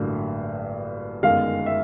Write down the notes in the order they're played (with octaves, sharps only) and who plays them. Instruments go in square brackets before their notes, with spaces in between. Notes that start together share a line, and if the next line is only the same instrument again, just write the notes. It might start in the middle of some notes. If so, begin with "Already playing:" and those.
Already playing: [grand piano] A1 G2 D3 F#3 A#3
G1 F#2 D#3 G#3 F5
E5